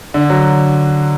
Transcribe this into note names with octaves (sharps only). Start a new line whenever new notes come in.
D3
F#3